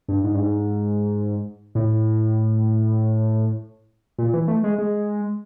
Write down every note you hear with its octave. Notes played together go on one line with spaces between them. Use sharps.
G2
G#2
G2
G#2
A2
A#2
E3
A3
G#3
G#3